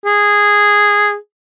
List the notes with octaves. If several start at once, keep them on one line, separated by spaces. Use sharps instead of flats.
G#4